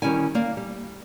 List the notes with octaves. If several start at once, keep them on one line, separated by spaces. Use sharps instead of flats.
D#3 G3 C#4 E4 D5 G#5
A#3 D5
G3